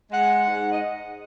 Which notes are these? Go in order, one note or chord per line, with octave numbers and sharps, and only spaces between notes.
G#3 F#5
G#2
D#5